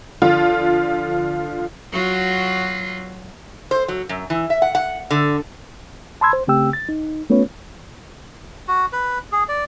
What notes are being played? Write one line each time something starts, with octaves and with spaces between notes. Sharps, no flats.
D3 F3 F4
F#3 F4 F#4
C5
F#3
F#2
E3
E5
F#5
F#5
D3
A5 B5 C6 E6 G#6
C5
C#3 A3 C4 G4 G5 E6
A6
D#4
A3 B3 C#4 F4 B4 C#5
F#4
B4
G#4
D5